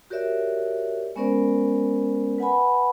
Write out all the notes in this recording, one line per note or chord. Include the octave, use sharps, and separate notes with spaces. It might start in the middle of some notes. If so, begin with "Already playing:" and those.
F#4 G4 A#4 C#5 D5 E5
G#3 B3 C#4 A#4 C5 D5
B4 F#5 G#5 B5